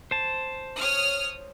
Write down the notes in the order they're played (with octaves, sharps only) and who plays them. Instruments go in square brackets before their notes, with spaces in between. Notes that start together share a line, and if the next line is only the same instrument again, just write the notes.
[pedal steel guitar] C5 A5
[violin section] C#5 D#6 F6